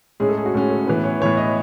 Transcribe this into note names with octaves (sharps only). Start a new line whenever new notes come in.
A2 G#3 C#4 G#4
A4
G#4
F#4
A2 G#3 C#4 G#4
A4
A2 E3 B3 B4
C#5
A2 E3 B3 C#5
D#5